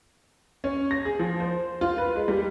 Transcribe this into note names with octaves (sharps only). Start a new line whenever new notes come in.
C#4
A#6
G#4
F3
C5
F4
B4
G#3
G3